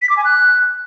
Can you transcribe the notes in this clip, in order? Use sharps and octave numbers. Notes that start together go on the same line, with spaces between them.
B6
D6
G#5
F#6